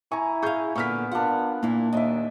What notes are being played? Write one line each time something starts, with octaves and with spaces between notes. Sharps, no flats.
E4 G#5 A#5 C#6
G#4 F5 C#6 G6
A#2 D3 B3 C#6 F6 B6
D4 F4 A#4 F#5
A#2 A#3 E4
D#2 D4 D#4 D#5 E5